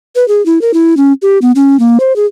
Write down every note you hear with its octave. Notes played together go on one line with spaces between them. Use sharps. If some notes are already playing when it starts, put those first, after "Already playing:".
B4
G#4
E4
A#4
E4
C#4
G4
B3
C#4
A#3
C5
G#4